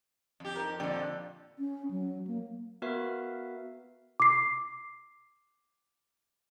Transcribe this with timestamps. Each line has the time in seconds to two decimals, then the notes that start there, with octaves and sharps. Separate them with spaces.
0.40 F2 G4
0.56 D#4 A#4
0.80 F2 A#2 D3 G4 D5
1.59 C#4
1.91 F#3
2.27 A#3
2.82 B3 F#4 A#4 B4 E5 F5
4.20 D6 C7